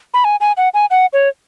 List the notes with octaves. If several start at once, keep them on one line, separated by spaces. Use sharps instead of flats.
B5
G#5
G#5
F#5
G#5
F#5
C#5